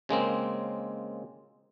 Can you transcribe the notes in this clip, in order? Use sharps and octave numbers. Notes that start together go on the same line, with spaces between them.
C#3 G#3 A#3 C4